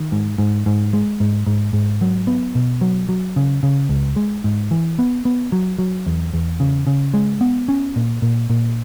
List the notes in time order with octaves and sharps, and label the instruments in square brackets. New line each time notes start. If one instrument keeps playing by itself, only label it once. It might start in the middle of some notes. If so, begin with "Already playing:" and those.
Already playing: [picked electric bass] D#3
G#2
G#2
G#2
G#3
G#2
G#2
G#2
F#3
B3
B2
F#3
F#3
C#3
C#3
C#2
G#3
G#2
E3
B3
B3
F#3
F#3
E2
E2
C#3
C#3
G#3
B3
C#4
A#2
A#2
A#2